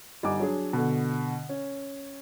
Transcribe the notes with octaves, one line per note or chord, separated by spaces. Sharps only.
G1 G3 D#4 F#5 G#5 D6
F#3 D4 G#4
B2 D3
C#4